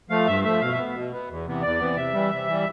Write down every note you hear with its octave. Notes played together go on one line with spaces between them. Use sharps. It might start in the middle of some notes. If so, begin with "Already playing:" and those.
F3 A3 F5
G2 E5
F3 A3 E5
B2 F5
E5
B3
B2
B3
E2
C3 E3 B3
E2 D5
C3 E3 B3
C3 E5
E3 G3
C3
E3 G3